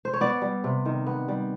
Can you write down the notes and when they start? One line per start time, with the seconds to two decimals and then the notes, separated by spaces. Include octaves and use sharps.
0.05 C5
0.14 C#5
0.21 B3 D5
0.42 G3
0.64 C3
0.85 D#3
1.06 B3
1.28 G3